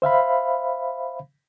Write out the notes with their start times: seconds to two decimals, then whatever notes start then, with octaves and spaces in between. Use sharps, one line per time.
0.02 C5 E5 F5 B5